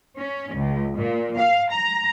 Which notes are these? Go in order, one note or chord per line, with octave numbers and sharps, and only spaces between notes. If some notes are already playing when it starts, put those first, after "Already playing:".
C#4
C#2
A#2
F5
A#5